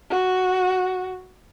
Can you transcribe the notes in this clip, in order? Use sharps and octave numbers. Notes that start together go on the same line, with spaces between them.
F#4